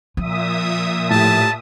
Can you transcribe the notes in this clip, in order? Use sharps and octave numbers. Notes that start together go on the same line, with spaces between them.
A#2 F3 E5 D#6
A2 G4 A5